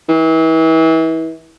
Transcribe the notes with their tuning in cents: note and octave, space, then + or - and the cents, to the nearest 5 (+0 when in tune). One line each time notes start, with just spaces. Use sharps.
E3 -35